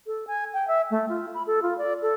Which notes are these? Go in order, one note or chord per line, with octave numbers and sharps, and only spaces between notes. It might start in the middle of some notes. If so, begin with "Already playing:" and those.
A4
G#5
G5
E5
A3
F4
B5
A4
F4
D5
A4